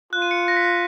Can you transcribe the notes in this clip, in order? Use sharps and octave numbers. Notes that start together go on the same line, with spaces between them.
F4 F#6
D#7
C#7
A#6
B6
A#6